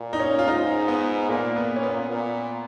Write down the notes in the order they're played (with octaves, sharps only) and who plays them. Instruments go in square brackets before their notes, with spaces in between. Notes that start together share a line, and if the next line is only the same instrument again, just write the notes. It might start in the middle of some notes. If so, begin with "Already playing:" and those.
Already playing: [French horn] A#2
[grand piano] D#4
C#4
F4
[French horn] G#2 [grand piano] D#4
[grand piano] B3
[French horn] A#2 [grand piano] A#3
[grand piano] B3
C#4
B3
[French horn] A#2